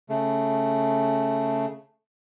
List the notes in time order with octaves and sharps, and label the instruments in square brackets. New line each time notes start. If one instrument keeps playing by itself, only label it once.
[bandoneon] C#3 A3